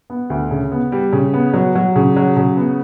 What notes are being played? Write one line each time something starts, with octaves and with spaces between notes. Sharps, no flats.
B3
D2
C#3
B3
G3
C#3
B3
F#3
F#3
C#3
F#3
C#3
B3